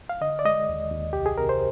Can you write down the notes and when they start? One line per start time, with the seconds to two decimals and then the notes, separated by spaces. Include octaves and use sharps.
0.09 F5
0.21 D3 D#5
0.39 D5
0.45 G#3 D#5
0.69 D#2
0.91 D#2
1.13 C2 G4
1.26 G#4
1.38 C3 A#4
1.49 C5